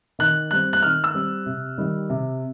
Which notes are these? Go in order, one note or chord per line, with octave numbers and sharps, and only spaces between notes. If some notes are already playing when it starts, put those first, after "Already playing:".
D#3 F#6
G3 C4 F#6
F#6
D#3 F6
E6
G3 C4
C3
D#3 G3
C3